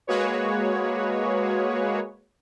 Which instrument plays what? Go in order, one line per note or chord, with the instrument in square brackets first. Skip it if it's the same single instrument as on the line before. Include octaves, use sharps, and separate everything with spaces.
[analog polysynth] G#3 A#3 F#4 G#4 B4 C#5